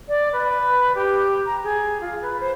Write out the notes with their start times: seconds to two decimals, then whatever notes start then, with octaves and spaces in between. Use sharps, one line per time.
0.08 D5
0.32 B4
0.95 G4
1.46 A#5
1.63 G#4
2.01 F4
2.22 B4
2.40 C5